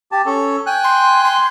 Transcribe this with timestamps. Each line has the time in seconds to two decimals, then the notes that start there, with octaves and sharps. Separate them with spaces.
0.12 G4 A5
0.26 C#4 A4
0.66 G5 G#5 F#6
0.84 C6
1.25 C6